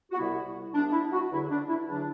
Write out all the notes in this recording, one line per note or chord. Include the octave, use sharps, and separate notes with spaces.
F#4
C2 C3 G3 B3 E4
C2 C3 G3 B3 D4
D4
E4
F#4
E2 D3 F#3 E4
D4
E4
E2 D3 F#3 D4